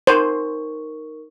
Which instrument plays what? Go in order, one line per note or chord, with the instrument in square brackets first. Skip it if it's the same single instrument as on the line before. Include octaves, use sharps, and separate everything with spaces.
[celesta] D#4 A#4 C#6 [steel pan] C5